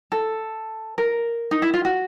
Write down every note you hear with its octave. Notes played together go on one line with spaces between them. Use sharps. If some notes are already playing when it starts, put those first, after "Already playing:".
A4
A#4
D#4
E4
F4
F#4